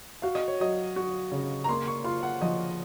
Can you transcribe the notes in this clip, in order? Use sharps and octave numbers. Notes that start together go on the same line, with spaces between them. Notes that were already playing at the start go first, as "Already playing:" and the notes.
F#4 F5
D#5
C#5
F#3 D#5
F#4
C#3
A#5
A#3 C6
C#6
F4 C6
F#5
F3 D#5